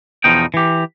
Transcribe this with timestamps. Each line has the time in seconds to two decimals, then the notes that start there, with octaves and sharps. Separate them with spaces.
0.24 E2 B2 F3 D#4 G5
0.54 E3 G4